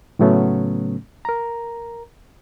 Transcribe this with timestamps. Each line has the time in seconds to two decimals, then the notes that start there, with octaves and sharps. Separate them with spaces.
0.19 A2 C#3 F#3 A3 B3 C#4
1.25 A#4 A#5